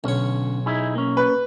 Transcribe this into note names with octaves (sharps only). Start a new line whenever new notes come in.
B1 D3 C#4 C#5
D#4 E4 G#4
A#3 C#4
B4